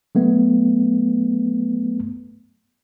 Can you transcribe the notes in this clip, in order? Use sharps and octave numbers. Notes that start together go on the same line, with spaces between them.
F#3 A3 B3